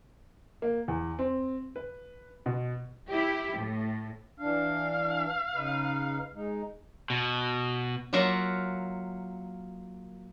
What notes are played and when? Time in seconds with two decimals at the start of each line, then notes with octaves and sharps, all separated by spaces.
0.62 A#3
0.88 E2
1.19 C4
1.76 B4
2.46 B2
3.08 E4 G4
3.56 A2
4.39 E3 D4 F5
5.54 C#3 D#4 B4
6.35 G#3 D#4
7.10 B2
8.13 F#3 A#3 F4 A#4 E5 F#5